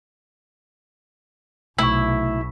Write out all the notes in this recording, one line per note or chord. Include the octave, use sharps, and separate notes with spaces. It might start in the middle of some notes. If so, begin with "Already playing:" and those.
B1 C3 A3 E4 C#6 E6